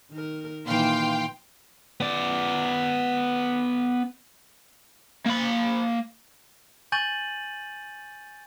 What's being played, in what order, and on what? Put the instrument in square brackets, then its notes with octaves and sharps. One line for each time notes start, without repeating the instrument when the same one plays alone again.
[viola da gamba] D#3 A#4
[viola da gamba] A#2 D#3 E3 [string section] F5 G5 C6
[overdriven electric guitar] B3 D5
A#3 B5
[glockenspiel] G#5 C#6 G6 A6 D#7 F#7